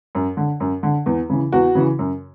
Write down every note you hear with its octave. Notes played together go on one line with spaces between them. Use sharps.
F#2
D3
F#2
D3
E2
C#3 E3
E2 F#4
C#3 E3
F#2